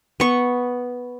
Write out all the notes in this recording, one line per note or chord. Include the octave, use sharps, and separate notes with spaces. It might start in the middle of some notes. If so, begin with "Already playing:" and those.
B3 C#6